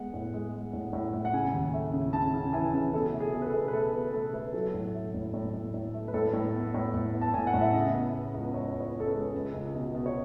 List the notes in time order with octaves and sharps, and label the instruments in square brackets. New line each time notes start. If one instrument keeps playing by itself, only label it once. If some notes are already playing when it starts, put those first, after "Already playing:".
Already playing: [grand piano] G#3 B3 F#5
A2
G#3
G#3
A2
A2
A2
F#5
C#3 G#5
D#2
A3
C#3
C#3 A5
C#3
E3 G#5
C#3
B2 A4
A3
G#4
B2
B4
A4
B2
B4
A3 A4
B2 G#4
A3 A4
A3 B4
F#3 A4
A2
A3
A2
A2
A2
A2
A3
B4
A2 A4
A2
B3
A2
A2
B3
A5
A2 G#5
F#5
A2
E5
C#3 D#5
B3
B3
C#2
C#2 C#5
C#2
C#5
C#3
A4
B4
G#3
C#2
C#2
B2
B2
C#5